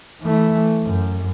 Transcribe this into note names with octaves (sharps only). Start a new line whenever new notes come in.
E3 A3
F#2